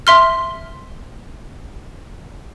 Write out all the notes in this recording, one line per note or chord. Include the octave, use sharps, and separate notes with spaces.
E5 C6 F6